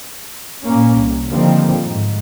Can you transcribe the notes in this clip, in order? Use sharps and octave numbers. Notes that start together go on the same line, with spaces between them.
A#2 A#3 C#4
C2
D3 D#3 F3 G3 A#3 C4
G#2